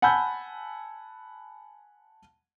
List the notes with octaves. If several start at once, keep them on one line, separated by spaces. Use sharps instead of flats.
F#5 G#5 A5 B5 E6 G6